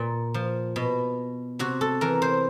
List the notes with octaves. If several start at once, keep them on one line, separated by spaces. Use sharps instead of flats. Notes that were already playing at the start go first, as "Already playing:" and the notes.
Already playing: A#2
F3
B2
C3 F#4
A4
E3 A#4
C5